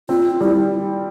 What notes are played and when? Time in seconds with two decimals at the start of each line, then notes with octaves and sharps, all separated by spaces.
0.09 C4 F4
0.41 G3 E4